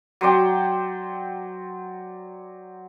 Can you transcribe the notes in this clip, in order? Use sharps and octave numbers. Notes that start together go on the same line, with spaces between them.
F#3 C5 D5 G5